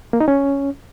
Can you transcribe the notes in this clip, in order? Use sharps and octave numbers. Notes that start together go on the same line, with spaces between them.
A#3
D#4
C#4